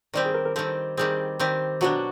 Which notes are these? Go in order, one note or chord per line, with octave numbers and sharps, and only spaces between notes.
D#3 G3 C4 D5
G#4
A#4
A#4
D#3 G3 C4 A4
D#3 G3 C4 G#4
D#3 G3 C4
B2 F#3 B3 D4 F#4